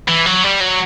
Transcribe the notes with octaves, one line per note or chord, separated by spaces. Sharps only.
E3
F#3
G3
F#3